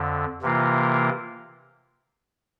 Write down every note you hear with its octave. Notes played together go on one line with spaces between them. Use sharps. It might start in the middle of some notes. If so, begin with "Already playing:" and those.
Already playing: F2 D3
C3 E3 A#3 F4 A#4